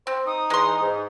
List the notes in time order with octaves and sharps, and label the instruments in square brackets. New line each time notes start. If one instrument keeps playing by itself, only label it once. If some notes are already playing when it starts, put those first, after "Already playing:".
[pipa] C4 [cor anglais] C5
[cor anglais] D#4 [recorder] D#6
[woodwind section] E2 [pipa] G#3 C6
[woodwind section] G#2